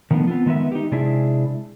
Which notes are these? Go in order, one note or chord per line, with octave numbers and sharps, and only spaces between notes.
D#3 F3 A3 B3 D4
B3 C4 F4
D#3 G#3 B3 B4 E5
D#4 G4
C3 G#3 D4 E4 G#4 E5